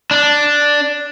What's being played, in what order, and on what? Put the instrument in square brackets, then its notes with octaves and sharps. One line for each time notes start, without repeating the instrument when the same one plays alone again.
[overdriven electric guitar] D4